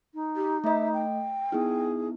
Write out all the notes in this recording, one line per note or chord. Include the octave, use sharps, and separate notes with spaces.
D#4
G4
A3 D#5 E5
G5
B3 D#4 E4 G#4